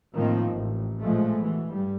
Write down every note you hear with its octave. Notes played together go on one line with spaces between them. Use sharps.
A2 D#3 F3 A#3 C4
A1
A#2 F3 G#3 A3
B2 E3
G2 G3